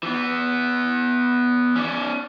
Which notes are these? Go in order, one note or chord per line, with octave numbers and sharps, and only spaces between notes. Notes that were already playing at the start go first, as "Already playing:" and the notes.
E3 B3
C#4 D5